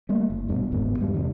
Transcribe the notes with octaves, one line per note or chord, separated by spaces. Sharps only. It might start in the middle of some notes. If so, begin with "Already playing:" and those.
G3 A3 A#3
F#1
D#1 G2 B2
F#1 D#2 G#2 B3
E2 G#2 G3
E2 C3 D#3